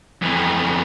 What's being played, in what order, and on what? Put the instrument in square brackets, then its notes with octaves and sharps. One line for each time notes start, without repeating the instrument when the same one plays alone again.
[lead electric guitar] F2 E3